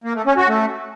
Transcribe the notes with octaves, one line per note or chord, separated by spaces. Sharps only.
A#3
A3
C#4
F#4
A3